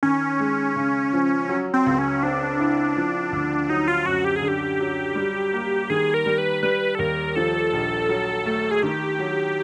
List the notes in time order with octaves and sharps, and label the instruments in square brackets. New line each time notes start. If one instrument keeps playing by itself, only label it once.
[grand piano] D#3 [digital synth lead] C#4
[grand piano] G#3
C#3
F3
F#3
[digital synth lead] C4
[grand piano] C#2
[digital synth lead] C#4
[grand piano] C4 [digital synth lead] D4
[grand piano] E4
F3
D2
[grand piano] F#3 [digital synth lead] D#4
[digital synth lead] F4
[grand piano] F#2 [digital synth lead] F#4
[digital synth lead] G4
G#4
[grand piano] D3
[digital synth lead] G4
[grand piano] F#3
G3
A#3
[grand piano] D#3 [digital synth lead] G#4
[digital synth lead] A#4
[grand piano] G3
[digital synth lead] B4
[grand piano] G3 [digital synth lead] B4
[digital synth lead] A4
[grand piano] D#2 [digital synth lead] A#4
[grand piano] F3 [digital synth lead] A4
[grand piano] A#1
F#3
A3
[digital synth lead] G#4
[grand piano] D#3 [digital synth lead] G4
[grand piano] F#3